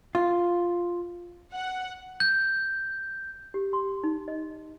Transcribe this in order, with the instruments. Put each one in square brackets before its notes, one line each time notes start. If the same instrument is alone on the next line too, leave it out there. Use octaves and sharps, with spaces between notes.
[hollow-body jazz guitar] F4
[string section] F#5
[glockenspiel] G6
[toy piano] G4
C6
D#4
D#5